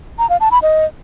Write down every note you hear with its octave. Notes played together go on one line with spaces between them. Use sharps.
A#5
F5
A5
B5
D#5